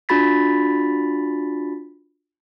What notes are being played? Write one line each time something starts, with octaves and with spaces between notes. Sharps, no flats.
D4 F4 F#4 B5 A6 B6